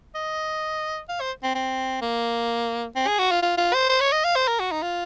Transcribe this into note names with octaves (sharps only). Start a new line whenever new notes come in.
D#5
F5
C5
C4
C4
A#3
C4
G#4
F#4
F4
F4
F4
C5
C5
C#5
D#5
F5
C5
A#4
F#4
D#4
F4